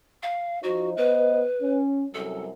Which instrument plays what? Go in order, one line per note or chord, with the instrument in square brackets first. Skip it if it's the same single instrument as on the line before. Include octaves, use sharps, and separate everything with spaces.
[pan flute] F5
[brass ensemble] F3 D#4 C5 [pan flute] F#4
[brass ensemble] B3 C5 D#5 [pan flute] B4
[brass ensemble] C#4
[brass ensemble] C2 F#2 [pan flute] A4